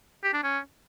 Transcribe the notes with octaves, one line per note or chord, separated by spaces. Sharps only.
G4
D4
C#4